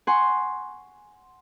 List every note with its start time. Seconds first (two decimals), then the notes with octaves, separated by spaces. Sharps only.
0.07 F#5 G#5 C6 C#6